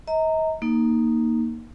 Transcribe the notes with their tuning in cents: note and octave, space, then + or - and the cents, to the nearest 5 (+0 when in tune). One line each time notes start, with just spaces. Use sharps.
D#5 +40 A#5 -20
A#3 +0 D#4 +0